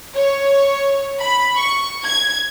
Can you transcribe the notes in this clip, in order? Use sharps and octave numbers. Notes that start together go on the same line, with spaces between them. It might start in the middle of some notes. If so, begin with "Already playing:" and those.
C#5
B5
C#6
G#6